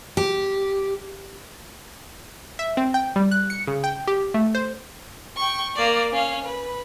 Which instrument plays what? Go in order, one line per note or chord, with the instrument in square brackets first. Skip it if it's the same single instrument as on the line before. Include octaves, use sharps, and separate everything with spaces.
[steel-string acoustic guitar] G4
[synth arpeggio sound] E5
C4
G5
G3
F#6
C#7
C#3
G5
G4
A3
C5
[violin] G5 C#6
A#3 D5
C#4 F5
B4